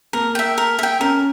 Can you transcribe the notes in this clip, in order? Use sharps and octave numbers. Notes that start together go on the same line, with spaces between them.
A#3 A#4
E5 G5
A#4
E5 G5
C#4 A#4